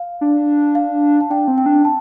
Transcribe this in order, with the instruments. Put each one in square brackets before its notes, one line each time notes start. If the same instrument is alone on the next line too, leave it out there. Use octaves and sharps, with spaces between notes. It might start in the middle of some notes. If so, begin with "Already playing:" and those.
Already playing: [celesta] F5
[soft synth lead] D4
[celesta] F5
A5
[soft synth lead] D4 [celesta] G5
[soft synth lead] C4
[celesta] G5
[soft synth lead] D4
[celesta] A5